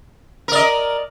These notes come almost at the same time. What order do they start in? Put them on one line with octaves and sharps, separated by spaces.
A#4 D5 D#5